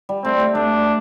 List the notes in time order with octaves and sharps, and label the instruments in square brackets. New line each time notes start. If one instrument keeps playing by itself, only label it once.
[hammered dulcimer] G3
[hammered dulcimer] A3 [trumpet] C4
[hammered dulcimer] A3
[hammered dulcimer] A3 [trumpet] D4